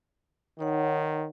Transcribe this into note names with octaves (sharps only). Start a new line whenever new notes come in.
D#3 D#4 C#5 F#5